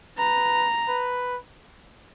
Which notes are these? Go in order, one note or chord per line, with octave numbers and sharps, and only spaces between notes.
B4 A#5
B4